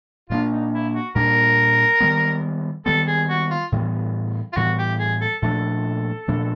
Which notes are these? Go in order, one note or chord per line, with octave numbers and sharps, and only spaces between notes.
A#2 G3 A#3 D4 F4
D#4
E4
F#4
A#2 G3 A#3 D4 A#4
D#3 G3 B3
D#3 G3 B3 A4
G#4
F#4
F4
A2 E3 G3 B3
F4
A2 E3 G3 B3 F#4
G4
G#4
A4
A#2 F3 A3 D4 A4
A#2 F3 A3 D4